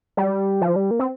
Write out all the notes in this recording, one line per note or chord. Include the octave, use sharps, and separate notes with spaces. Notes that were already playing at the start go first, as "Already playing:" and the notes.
G3
F3
G3
A#3
C4